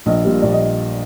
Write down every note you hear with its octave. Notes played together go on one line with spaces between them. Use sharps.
A#1 D#5
A#2 G3
A#1 D5
D#5